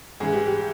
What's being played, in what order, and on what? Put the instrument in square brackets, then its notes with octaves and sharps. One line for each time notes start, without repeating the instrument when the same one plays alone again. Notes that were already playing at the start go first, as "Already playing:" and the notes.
[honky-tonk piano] G#2 E3 G#4
G4
G4